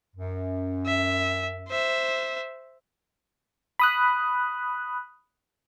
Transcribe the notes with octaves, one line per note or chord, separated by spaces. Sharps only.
F#2
E5
C5 E5
B5 D#6 F#6